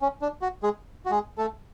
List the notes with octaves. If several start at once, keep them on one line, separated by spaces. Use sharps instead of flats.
C#4
D4
F#4
G#3 G#4
F#4
G#3 G#4
A3 A4